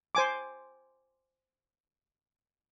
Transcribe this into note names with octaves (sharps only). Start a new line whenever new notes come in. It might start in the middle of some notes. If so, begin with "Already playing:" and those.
C5 G#5 D6